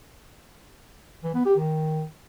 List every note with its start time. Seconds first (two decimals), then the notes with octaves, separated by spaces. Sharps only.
1.24 E3
1.35 B3
1.45 G4
1.56 D#3